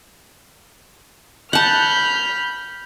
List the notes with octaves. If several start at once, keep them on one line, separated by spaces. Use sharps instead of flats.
F#5 A5 B5 F6 G6